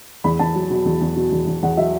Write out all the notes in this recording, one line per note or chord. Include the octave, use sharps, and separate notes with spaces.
E2 B5
E2 A5
F#3
B2
E2
E2
B2
E2
E2
E2 F#5
F#3 E5